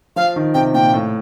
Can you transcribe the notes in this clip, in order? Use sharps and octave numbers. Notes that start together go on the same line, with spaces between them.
F3 F5
D#3
C3 G5
A#2 G5
A2